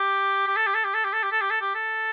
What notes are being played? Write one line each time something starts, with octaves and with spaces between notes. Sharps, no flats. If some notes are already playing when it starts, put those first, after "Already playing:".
Already playing: G4
G4
A4
G4
A4
G4
A4
G4
A4
G4
A4
G4
A4
G4
A4